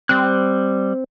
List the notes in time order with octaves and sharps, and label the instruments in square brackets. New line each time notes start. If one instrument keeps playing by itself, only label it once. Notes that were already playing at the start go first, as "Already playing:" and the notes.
[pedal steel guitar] G3 F#6 [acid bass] C4